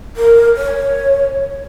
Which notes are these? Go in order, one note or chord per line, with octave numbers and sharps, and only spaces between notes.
A#4
C#5